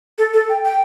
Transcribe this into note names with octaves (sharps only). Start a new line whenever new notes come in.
A4
A4
G5
G5